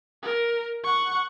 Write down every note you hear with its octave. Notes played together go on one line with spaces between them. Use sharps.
A#4
F#5 C#6